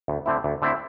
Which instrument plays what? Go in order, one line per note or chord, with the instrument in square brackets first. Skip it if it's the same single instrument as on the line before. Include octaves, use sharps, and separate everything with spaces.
[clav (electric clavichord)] D2
D3 A3 C4 E4
D2
D3 A3 C4 E4